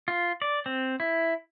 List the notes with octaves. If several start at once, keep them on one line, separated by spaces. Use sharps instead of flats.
F4
D5
C4
E4